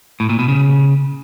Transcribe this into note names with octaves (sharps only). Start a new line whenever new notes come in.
A2
A#2
B2
C#3